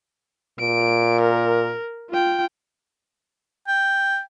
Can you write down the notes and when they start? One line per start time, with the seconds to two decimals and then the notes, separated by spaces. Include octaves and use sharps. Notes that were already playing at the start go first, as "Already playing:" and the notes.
0.60 A#2 D7
1.21 A#4
2.10 F4 G5
3.67 G5